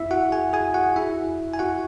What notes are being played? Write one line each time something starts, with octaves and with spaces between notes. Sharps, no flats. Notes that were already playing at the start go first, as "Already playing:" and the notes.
Already playing: E4 E5
F#4 F#5
G#4 G#5
G#4 G#5
F#4 F#5
E4 E5
G#5
F#4 F#5